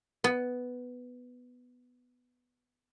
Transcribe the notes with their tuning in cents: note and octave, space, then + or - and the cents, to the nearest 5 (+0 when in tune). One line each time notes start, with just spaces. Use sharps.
B3 +5